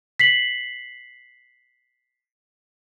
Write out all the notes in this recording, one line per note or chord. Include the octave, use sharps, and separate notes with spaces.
B6 C7 F#7